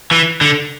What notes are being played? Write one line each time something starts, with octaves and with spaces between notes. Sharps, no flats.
E3
D3